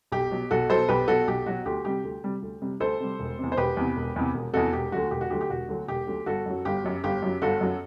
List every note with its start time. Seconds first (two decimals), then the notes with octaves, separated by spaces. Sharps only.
0.12 B1 G4
0.31 B2 F#3
0.51 B1 F#4 A4
0.70 B2 F#3 A4 C5
0.89 B1 G4 B4
1.08 B2 F#3 F#4 A4
1.28 B1 G4
1.46 B2 F#3 F#4
1.65 D2 G4
1.85 C3 G3 G4
2.04 D2
2.24 C3 G3
2.42 D2
2.62 C3 G3
2.80 D2 A4 C5
3.00 C3 G3
3.20 E1
3.39 E2 C3
3.52 C5
3.57 E1 G4 B4
3.77 E2 C3
3.97 E1
4.16 E2 C3
4.34 E1
4.53 E2 C3 F#4 A4
4.73 E1 G4
4.92 D2 D3 F#3 F#4
5.11 E1 G4
5.21 F#4
5.30 D2 D3 F#3 G4
5.41 G4
5.50 E1 F#4
5.69 D2 D3 F#3
5.88 E1 G4
6.07 D2 D3 F#3
6.26 G1 F#4 A4
6.46 F#2 F#3
6.65 G1 G4
6.84 F#2 F#3
7.04 G1 G4
7.22 F#2 F#3
7.42 G1 F#4 A4
7.61 F#2 F#3